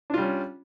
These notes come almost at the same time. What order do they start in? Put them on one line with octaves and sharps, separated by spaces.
D4 F4 G3 C#4